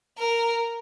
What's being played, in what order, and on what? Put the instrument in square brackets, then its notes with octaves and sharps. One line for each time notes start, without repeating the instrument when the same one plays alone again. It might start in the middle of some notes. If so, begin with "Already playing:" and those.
[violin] A#4